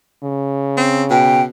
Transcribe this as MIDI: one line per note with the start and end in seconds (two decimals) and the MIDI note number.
0.23 1.45 49
0.77 1.04 60
1.10 1.46 47
1.10 1.42 79